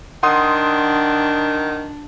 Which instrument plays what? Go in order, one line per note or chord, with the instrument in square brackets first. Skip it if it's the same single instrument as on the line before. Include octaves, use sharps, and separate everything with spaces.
[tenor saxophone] D#3 [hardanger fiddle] D4 [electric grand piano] F#5 C6 D#6